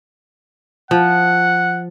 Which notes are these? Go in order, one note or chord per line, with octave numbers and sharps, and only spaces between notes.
F3 F#5